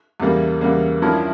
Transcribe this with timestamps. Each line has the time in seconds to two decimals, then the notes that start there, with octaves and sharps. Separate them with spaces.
0.20 E2 C#3 G3 A#3
0.61 E2 C#3 G3 A#3
1.02 G2 F3 C#4 E4 A#4